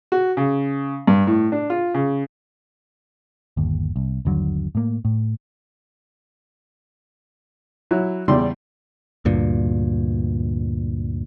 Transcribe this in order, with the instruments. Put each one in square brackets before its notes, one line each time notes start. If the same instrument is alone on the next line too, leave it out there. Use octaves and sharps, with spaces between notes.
[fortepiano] F#4
C#3
G2
A2
D4
F4
C#3
[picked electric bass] G1 D#2
C2
G1 D#2 D3 F#3
A2 A#3
A2
[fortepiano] F#3 E4
E2 C#3 G3 D5 C6
[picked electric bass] D2 G2 A#2